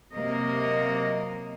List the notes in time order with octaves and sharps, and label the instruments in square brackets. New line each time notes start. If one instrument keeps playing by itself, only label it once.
[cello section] C3 F#3 A#3 D#5